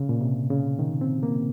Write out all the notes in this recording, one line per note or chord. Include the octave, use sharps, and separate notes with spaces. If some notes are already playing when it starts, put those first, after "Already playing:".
Already playing: C#3
A#2
C3
C#3
D#3
C4
A#3